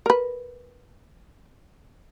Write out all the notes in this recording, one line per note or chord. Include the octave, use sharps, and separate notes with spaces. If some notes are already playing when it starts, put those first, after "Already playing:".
A#4 B4